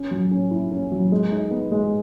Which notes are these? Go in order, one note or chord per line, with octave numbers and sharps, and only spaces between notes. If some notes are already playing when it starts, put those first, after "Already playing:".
Already playing: C#4
F#3
C#4
E4
C#4
F#3
G#3
D#4
B3
G#3